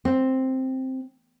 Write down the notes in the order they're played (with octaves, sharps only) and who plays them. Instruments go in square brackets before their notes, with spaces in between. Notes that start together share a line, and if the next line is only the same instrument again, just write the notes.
[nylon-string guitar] C4